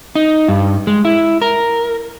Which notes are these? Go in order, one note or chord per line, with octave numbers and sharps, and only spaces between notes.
D#4
G2
G#3
E4
A#4